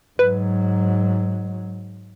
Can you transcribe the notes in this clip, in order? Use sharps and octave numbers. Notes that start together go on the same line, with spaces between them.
G#2 F#3 B4